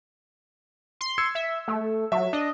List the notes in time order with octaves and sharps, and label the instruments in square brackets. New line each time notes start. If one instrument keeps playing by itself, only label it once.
[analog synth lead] C6
[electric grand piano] E6 G#6 C#7
[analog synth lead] E5
A3
[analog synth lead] F#3 [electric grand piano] E5
[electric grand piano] D4 [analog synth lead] D#5